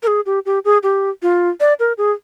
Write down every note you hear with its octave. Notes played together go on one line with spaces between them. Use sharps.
A#4
G#4
G4
G4
G#4
G4
F4
D5
A#4
G#4